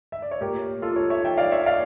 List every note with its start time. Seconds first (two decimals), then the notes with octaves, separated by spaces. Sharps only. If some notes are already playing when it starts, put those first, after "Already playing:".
0.12 E5
0.22 D5
0.31 C#5
0.41 A#2 A3 G4 A#4
0.82 F4 A4
0.96 A4 C#5
1.10 C#5 E5
1.24 E5 G5
1.38 D5 F5
1.52 C#5 E5
1.66 D5 F5